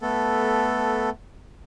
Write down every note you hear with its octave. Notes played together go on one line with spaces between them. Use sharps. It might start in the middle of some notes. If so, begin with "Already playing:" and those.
A3 B3 A4